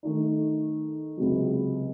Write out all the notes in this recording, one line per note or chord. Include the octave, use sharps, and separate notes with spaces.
D#3 A3 D#4
C#2 C3 F#3